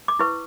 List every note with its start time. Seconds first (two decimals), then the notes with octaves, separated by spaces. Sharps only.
0.08 D6
0.19 E4 B4 C#6